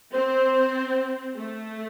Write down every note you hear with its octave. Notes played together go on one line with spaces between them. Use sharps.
C4 C5
A3